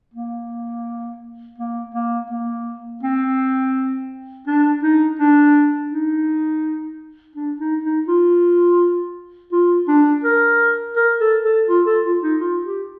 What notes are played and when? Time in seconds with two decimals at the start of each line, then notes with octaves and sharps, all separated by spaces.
0.14 A#3
1.58 A#3
1.94 A#3
2.30 A#3
3.03 C4
4.47 D4
4.83 D#4
5.19 D4
5.91 D#4
7.35 D4
7.60 D#4
7.83 D#4
8.08 F4
9.52 F4
9.88 D4
10.24 A#4
10.96 A#4
11.20 A4
11.44 A4
11.68 F4
11.86 A4
12.05 F4
12.22 D#4
12.40 F4
12.65 G4